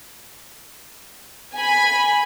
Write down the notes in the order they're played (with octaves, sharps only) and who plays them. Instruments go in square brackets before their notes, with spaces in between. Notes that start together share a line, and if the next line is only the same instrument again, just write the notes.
[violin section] G#5 B5